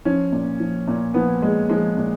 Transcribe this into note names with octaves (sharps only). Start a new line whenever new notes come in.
F3 C#4
A#2
F3
A#2
F3 B3
A#2 G#3
F3 G#3
A#2